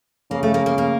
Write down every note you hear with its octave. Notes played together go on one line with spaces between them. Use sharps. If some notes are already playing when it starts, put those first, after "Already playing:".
C#3 A#3
A3
A#3
A#3
A#3